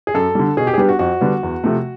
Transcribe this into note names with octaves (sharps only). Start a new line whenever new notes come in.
G#4
F#2 A4
D3 G3
B2 G#4
G4
G#4
G3 B3 D4 G4
F#4
F2 F#4
D3 G3 B3 D4
E2
C3 F3 A3